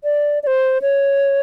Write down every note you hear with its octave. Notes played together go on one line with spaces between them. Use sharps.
D5
D5
C5
C#5